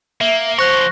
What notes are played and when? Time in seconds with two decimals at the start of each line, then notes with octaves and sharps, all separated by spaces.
0.21 A#3 E5
0.59 F3 C5 C#5 C#6 F#6 A#6